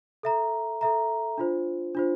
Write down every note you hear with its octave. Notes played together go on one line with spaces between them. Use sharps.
A4 E5 A#5
A4 E5 A#5
D4 F4 C5
D4 F4 C5